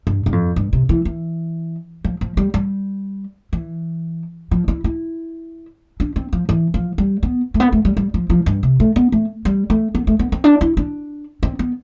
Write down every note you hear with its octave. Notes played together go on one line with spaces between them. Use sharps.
G2
G2
F2
G2
C3
E3
E3
F3
F3
G3
G3
E3
F3
E4
E4
D4
C4
F3
E3
F3
G3
B3
A3
B3
A3
G3
G3
F3
F3
G2
C3
A3
B3
A3
G3
A3
B3
A3
B3
C4
D4
E4
D4
C4
B3